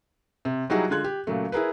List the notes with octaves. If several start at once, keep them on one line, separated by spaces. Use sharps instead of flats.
C3
F#3 G3 D#4 E4 F#4 G#4
D3 G#3 F4 F#6 G#6
G4
A#2 C#3 F#3 A3
E4 G#4 A#4 B4